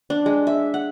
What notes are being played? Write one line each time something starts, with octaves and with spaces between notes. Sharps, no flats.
D4
G#3
E5
F#5